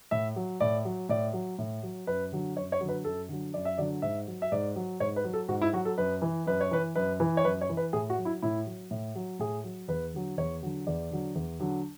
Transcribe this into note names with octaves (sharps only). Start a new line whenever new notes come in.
A2 E5
F#3
A2 D5
F#3
A2 D5
F#3
A2
F#3
F#2 B4
D3 F#3
F#2 C#5
C#5
D3 F#3
B4
F#2 A4
D3 F#3
F#2 D5
E5
D3 F#3 D5
G#2 E5
F#3
E5
G#2 D5
F#3
G#2 C#5
B4
F#3
A4
G#2 F#4
E4
F#3 F#4
A4
F#2 B4
E3
F#2 B4
C#5
E3 B4
F#2 B4
E3
C#5
F#2 B4
C#5
E3
B4
A2 G#4
F#4
F#3
E4
A2 E4
F#3
A2
F#3
A2 G#4
F#3
E2 B4
D3 F#3
E2 C#5
D3 F#3
E2 D5
D3 F#3
E2
D3 F#3